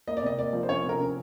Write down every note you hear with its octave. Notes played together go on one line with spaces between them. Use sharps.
A#3 D#5
D5
C3 D#5
A#3 D5
F3
C5
C#4 C#5
C3
A#4
C#4